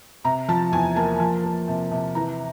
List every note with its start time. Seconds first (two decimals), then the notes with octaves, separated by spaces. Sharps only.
0.25 C3 A#5
0.49 F3 A5
0.72 E2 G#5
0.96 A#3 A5
1.20 F3
1.44 A#3
1.68 C3
1.92 C3
2.15 E3 A#5